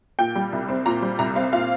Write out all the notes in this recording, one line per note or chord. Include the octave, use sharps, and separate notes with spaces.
A#2 G5
G3
C2
C4
A#2 A#5
G3
C2 A#5
C4 F5
A#2 F5